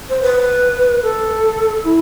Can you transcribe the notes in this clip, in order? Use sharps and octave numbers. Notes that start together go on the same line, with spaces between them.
C5
B4
A4
E4